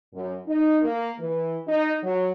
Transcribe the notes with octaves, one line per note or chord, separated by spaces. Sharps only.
F#2
D#4
A#3
E3
D#4
F#3